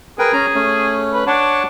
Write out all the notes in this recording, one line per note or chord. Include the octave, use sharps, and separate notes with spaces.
G#4 A#4 B4 G5
C#4 A#5
A3 C#4
B4
D4 C#5 F#5 A5